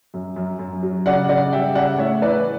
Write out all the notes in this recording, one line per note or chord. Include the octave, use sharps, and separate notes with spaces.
F#2
F#2
F#2
F#3
C#3 D5 F#5
C#3 D5 F#5
G3 E5 G5
C#3 D5 F#5
A2 C#5 E5
E3 B4 D5